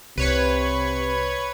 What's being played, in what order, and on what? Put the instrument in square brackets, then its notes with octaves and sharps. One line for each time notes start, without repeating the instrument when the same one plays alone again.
[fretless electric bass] C2 [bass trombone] C3 [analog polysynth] B4 C#5 G#6